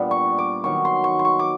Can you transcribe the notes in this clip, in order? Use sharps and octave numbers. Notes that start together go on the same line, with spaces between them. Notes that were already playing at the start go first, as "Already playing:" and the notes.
Already playing: A#2 G3 B3 D4
C#6
D6
D#3 F#3 B3 C#6
C6
C#6
C6
C#6
D6